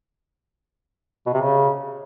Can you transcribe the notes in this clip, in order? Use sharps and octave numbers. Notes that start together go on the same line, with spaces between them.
B2
C3
C#3